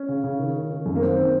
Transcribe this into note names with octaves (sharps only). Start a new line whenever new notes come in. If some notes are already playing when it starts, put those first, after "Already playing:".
Already playing: C#4
C#3
C#3
D#3
D#3
D#3
F#2
A#3
D#3 C4